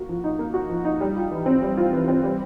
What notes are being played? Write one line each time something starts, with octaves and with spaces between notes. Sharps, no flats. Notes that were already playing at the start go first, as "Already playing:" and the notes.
Already playing: A#3 F#4
F3
D#4
A#3
F#4
F3
D#4
G3
F4
E3
C4
G3
F4
E3
C4
G3